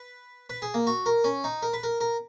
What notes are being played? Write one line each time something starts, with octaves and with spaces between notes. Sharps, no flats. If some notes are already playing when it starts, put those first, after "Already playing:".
Already playing: B4
B4
G#4
A#3
F#4
A#4
C#4
D#4
A#4
B4
A#4
A#4